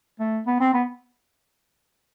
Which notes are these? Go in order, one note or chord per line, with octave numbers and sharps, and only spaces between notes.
A3
B3
C4
B3